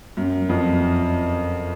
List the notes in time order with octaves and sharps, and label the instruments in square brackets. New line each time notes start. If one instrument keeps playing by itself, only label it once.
[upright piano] F#2
F2